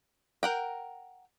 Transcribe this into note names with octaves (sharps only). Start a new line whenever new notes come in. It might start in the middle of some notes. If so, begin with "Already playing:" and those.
A#4 F#5 G5